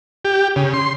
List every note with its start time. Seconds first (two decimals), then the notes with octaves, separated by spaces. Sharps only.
0.25 G4
0.56 C#3
0.74 C6